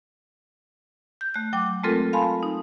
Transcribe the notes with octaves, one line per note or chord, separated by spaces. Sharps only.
G6
A3 F#6
F#3 G5 D6
G#3 A3 C4 F4 A4 A#4
F5 G#5 A5 B5 C6
D#4